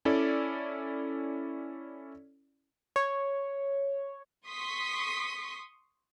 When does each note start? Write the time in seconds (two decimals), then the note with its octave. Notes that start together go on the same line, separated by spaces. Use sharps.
0.05 C#4 E4 A4 D5
2.96 C#5
4.47 C6 C#6 D#6 B6